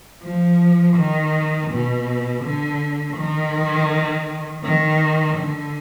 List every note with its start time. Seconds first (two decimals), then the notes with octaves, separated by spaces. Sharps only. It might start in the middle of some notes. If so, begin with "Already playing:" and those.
0.23 F3
0.97 D#3
1.70 B2
2.44 D3
3.17 D#3
4.64 D#3
5.37 D3